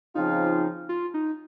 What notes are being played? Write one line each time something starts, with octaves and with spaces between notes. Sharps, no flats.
C#3 F3 C4 D#4 F4
F4
D#4